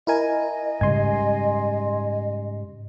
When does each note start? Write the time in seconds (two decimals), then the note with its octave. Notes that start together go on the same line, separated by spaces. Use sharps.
0.07 E4 A#4 D#5 G#5
0.81 G#2 C#3 G3 G#5 C6